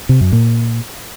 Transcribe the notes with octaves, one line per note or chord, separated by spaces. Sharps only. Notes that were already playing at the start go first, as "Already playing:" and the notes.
C3
F#2
A#2